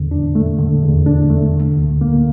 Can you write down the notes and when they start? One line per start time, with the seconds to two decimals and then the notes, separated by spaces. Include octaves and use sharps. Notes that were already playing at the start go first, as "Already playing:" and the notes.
Already playing: E2 D3
0.11 D4
0.35 A3
0.59 D3
0.83 E2
1.06 D4
1.30 A3
1.54 D3
1.77 D2
2.01 A#3